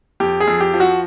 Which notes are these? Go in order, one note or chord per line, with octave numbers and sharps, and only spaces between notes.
F2 G4
G#4
F2
G4
F3
F#4